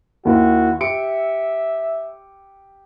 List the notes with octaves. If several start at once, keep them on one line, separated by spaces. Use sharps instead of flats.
D#2 E4 F#4 A#4
G4 E5 C#7 D7